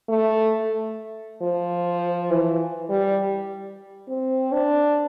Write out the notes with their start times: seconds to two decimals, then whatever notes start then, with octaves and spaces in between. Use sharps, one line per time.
0.09 A3
1.42 F3
2.30 E3
2.89 G3
4.08 C4
4.52 D4